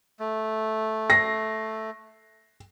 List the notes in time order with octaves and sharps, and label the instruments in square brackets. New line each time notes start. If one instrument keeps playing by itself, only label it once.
[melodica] A3
[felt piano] A#6 C7